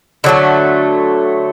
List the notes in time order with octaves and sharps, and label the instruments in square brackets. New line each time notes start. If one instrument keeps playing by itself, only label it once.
[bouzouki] D3 F#3 A3